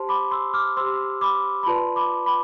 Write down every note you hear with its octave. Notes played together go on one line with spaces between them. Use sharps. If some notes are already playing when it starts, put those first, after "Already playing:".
Already playing: G4 C5 A5 C6
B5 D6
C6 E6
D6 F6
G4 C5 C6 E6
B5 D6
B5
F4 B4 D5 A5 C6
B5 D6
B5 D6